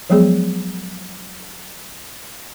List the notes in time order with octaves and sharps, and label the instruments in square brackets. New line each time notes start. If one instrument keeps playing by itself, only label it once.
[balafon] F3 F#3 G#3 B3 G#4